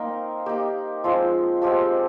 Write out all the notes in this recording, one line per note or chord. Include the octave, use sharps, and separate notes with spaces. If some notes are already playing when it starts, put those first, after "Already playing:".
Already playing: A#3 C4 D#4 A#4 F5
A#3 D#4 G4
F3 G#3 C4 F4
F3 G#3 C4 G4